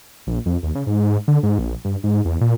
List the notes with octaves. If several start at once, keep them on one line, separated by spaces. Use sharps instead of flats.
A#1
F2
D#2
C#3
G#2
D3
G#2
A#1
G2
G#2
E2
A#2